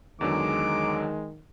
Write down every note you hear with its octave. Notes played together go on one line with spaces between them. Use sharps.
E2 D3 D#3 F#3 G#3 D6